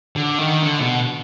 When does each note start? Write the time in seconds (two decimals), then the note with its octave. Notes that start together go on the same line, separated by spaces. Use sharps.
0.16 D3
0.39 D#3
0.63 D3
0.80 B2